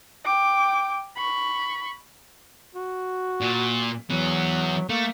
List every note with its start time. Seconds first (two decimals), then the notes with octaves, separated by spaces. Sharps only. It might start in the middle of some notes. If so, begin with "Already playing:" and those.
0.25 G5 D6
1.17 B5 C#6
2.75 F#4
3.41 A#2
4.10 E3 F#3 B3
4.89 A3 A#3